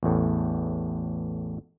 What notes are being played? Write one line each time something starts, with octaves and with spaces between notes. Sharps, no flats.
A1 E2 A2